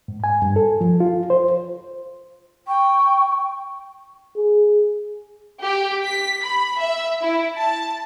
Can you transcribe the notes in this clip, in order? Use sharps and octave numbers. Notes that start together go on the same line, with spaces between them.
G#2
G#5
G2
A4
F3
F4
C5
G5 C#6
G#4
G4
B6
B5
E5
E4
A5